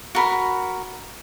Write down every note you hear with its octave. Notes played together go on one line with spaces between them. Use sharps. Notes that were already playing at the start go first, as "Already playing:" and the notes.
F#4 A#4 B5